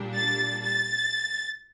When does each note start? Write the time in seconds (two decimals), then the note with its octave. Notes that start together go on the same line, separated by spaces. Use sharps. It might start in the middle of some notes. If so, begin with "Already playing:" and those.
Already playing: A#2 G3 D4
0.15 A6
0.63 A6